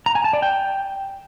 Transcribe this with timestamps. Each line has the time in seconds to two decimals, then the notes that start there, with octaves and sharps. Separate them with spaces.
0.06 A#5
0.15 G#5
0.24 A5
0.33 D5
0.42 G5